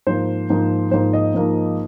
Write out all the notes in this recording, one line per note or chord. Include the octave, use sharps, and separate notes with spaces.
G#2 F3 A#3 C5
G#2 F3 A#3
G#2 F3 A#3 C5
D#5
G#2 F3 A#3